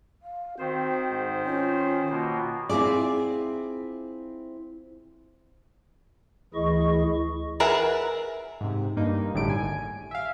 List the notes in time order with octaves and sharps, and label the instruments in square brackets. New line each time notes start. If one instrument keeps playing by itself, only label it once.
[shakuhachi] F5
[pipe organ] D#3 C5 [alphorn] C4 [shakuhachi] F#4
[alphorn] G#2
[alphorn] C#4 [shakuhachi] F4
[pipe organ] B2 A#3
[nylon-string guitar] C4 E4 F4 G#4 D5
[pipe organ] D2 E3 E4 G#4 D#5 C#6
[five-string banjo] G#4 A#4 B4 E5 F#5
[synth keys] G#2 C3
G2 A#3 D#4
G#1 A2 D3 G3 D7
G#5
E5 F5